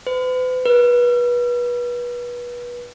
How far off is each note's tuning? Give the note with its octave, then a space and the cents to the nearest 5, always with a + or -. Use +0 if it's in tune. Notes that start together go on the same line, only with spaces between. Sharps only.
B4 +45
B4 -30